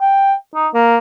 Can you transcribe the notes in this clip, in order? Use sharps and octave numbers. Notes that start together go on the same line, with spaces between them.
G5
D#4
A#3